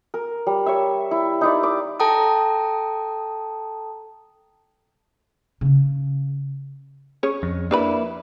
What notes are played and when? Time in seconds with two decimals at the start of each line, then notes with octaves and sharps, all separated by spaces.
0.14 A#4
0.47 G3
0.66 C#5 E5
1.11 E4
1.41 D#4 E4 D5
1.63 D6
2.00 A4 G5 A5 A#5 D#6
5.61 C#3 C#4
7.23 C#4 G#4 C#5
7.43 F2
7.71 A#3 D4 E4 B4 B5